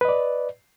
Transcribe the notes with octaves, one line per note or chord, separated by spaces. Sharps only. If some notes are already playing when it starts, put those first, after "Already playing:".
B4 D5 D#5